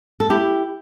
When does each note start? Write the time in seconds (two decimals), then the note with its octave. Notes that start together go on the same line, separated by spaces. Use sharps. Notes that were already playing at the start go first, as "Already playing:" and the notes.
0.20 A4
0.30 E4 G4